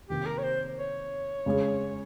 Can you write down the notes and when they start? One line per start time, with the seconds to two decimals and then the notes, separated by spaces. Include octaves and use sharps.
0.09 C3 D#3 A#3 G4
0.26 A#4
0.38 C#5
0.43 C5
0.77 C#5
1.46 C#3 G#3 C#4 G#4